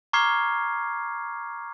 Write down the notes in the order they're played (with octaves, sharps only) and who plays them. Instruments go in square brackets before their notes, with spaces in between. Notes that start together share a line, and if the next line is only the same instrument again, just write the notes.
[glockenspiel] A#5 C#6 D6 F6 G#6 C7